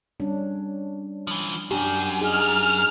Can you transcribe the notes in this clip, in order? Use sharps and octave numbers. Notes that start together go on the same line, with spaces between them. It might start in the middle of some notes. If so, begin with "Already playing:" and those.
G3 C#4 D4
E3 F3
F#2 D4 G4
D#4 G#4 F6